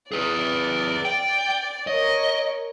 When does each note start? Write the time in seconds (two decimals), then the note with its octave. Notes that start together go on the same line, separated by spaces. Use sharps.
0.12 G#4 B4 D5
1.05 G5
1.87 A#4 C#5 D#5